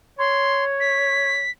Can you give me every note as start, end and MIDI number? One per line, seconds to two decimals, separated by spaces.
0.19 1.46 73
0.19 0.64 84
0.80 1.51 95